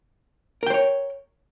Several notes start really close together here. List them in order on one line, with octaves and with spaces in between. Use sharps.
A#4 G5 C5 C#5